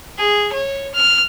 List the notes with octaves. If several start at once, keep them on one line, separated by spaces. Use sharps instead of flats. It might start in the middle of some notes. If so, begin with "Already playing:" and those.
G#4
C#5
F6